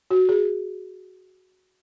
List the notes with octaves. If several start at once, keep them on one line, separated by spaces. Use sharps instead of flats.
F#4
G#4